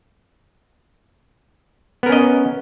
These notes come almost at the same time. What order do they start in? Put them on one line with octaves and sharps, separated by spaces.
B3 A#4 C#4 D#5